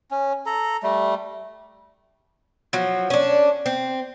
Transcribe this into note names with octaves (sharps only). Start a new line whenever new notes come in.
C#4
A4 A#5
G3 A3
F3 F#3
C#4 D4
C4